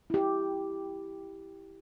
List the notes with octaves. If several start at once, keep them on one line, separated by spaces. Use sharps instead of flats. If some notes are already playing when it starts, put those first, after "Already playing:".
E4 G4